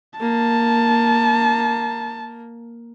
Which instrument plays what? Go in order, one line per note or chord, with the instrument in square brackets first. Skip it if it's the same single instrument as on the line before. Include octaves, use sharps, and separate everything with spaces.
[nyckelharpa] A#3 [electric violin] A5